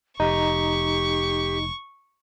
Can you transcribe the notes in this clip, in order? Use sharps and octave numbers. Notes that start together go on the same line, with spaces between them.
F1 D#4 G4 C#6